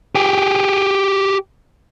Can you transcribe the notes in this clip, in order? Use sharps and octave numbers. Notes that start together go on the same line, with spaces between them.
G4 G#4